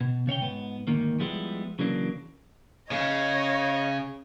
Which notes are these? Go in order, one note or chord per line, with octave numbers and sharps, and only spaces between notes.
B2
C#3 C#5 F5 G5
G#2 B3
D2 G#2 D#3 A#3
F3 G3 G#3 B3 E4
C#3 E3 F#3 A#3 D4
C#3 C#5 D#5